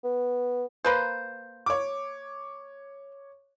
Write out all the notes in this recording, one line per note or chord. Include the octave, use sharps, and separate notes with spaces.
B3
A#3 B4 C5
C#5 D6